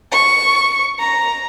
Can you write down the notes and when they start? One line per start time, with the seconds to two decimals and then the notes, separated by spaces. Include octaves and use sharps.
0.12 C#6
0.99 A#5